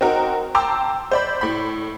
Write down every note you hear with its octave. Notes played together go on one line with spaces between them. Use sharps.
C4 D#4 F#4 A#4
G5 A5 A#5 C6 D6 E6
C5 D5 B5
A2 B5